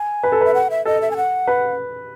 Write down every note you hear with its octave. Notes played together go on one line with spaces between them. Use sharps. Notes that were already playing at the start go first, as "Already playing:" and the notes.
Already playing: G#5
B4
A4
B4 E5
F#5
E5
A4 D#5
E5
G#5
F#5
B4